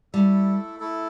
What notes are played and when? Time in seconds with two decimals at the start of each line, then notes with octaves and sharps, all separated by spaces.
0.13 G3 A3 E4 A4
0.79 A3 E4 A4